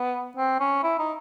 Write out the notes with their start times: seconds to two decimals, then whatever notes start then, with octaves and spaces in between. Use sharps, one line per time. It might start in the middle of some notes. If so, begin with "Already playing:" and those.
Already playing: B3
0.37 C4
0.60 C#4
0.83 E4
0.99 D#4